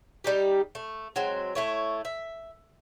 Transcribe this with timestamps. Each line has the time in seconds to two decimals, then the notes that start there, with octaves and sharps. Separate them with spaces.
0.24 G3 D#4 G4
0.75 A3
1.16 F#3 G#3 C4
1.55 A3 E4 C#5
2.05 E5